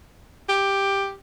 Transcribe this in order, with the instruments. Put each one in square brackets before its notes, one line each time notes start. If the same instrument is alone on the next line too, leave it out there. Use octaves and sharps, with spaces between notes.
[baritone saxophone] G4